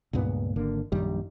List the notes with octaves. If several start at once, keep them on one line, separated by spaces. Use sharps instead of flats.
C#2 G2 A#2 B3
G#1 D3 A#3
A#1 F#2 D#3 G3